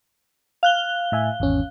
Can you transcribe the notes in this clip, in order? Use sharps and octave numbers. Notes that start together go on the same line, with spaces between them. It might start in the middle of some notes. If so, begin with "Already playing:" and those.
F5 F#6 G7
A2 E5 G#5
G#1 E2 C#4